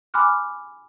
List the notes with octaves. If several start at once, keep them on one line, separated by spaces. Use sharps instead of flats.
G#5 B5 C6 D6 F6 F#6